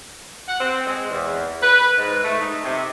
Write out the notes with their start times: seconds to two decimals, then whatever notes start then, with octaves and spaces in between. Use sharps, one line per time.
0.48 F#5
0.60 C4
0.87 G#3
1.10 E2
1.62 B4
1.98 G#2
2.24 A3
2.42 D#4
2.64 C3